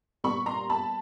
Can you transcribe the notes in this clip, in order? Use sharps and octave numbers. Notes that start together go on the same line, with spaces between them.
A#2 G3 B3 B5 C#6
A#5 C6
A5 B5